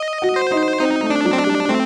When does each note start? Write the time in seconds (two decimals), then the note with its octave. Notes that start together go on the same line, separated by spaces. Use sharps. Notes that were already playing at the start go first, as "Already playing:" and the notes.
Already playing: D#5
0.22 F#4
0.36 C5
0.51 D#4
0.80 C4 D#4
1.02 A3
1.10 D4
1.25 F#3
1.33 C4
1.39 D4
1.47 G3
1.69 A3 C4